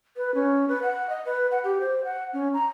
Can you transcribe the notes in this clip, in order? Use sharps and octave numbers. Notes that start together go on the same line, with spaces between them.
B4
C#4
B4
F#5
D#5
B4
F#5
G4
C5
F#5
C#4
A#5